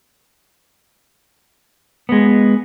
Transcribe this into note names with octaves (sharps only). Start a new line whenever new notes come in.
G#3 B3